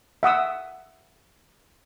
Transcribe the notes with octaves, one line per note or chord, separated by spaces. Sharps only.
E5 F#5 D#6 E6